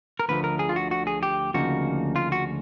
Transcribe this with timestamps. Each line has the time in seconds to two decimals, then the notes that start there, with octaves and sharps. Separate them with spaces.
0.19 A#4
0.29 D2 D3 F3 A3 B4
0.44 A#4
0.59 G#4
0.69 F4
0.76 F#4
0.91 F#4
1.07 G#4
1.23 G4
1.54 D2 C#3 F3 A#3 D#4 F#4
2.16 F4
2.32 F#4